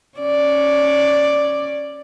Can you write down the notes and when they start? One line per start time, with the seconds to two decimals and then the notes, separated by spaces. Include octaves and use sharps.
0.18 C#4 D5